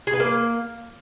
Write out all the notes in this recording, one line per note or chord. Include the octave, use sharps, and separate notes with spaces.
G#4
B4
A#3